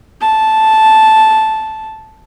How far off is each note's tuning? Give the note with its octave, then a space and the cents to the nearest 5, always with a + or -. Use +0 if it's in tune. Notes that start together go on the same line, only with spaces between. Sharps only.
A5 -5